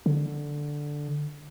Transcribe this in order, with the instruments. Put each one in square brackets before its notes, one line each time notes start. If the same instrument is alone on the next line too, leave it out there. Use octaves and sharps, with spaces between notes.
[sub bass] D3